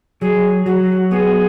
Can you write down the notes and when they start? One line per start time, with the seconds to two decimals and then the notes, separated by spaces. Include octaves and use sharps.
0.21 F#3 G#4
0.66 F#3 F#4
1.11 B3 G#4